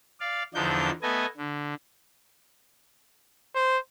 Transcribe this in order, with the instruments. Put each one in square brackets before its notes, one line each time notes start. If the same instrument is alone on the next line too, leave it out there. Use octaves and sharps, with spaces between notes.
[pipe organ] D5 F5
E2 D3 F3 D4 D#4 G6
A3 B3 D#5 G#5
D3
[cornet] C5